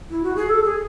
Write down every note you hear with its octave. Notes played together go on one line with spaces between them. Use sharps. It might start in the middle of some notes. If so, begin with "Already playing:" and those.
E4
F#4
G#4
A4
G#4